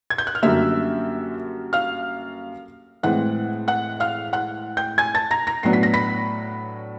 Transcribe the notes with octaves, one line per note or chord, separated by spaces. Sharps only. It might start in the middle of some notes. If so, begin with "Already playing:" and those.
G#6
G6
F#6
F6
F#2 D3 G3 A#3 E5 E6
F5 F6
A2 E3 G#3 C4 F#5 F#6
F#5 F#6
F5 F6
F#5 F#6
G5 G6
G#5 G#6
A5 A6
A#5 A#6
A#5 A#6
A2 F#3 B3 D4 C7
B6
A#6
B5 B6